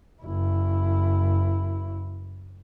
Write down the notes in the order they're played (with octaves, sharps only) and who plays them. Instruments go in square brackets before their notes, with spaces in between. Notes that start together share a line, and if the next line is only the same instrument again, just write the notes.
[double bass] F#1 E4